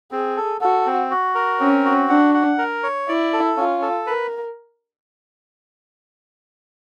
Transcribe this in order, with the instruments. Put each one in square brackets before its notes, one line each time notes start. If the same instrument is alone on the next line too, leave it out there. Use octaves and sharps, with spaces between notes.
[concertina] C4 [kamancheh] G#4
[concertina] A4
[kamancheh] F#4 [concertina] A4
[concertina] C4
F#4
A#4
[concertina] C4 [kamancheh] C#4
[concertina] F#4
[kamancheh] D4 [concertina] F#5
[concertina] F#5
A#4
C#5
[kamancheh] E4 [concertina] D5
[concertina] A4
[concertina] C#4 [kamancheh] F4
[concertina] A4
[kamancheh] A#4 [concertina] B4